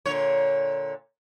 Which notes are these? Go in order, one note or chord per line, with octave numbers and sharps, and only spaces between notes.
A#2 D3 C#5